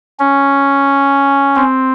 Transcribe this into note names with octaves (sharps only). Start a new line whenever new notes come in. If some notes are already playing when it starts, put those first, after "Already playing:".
C#4
C4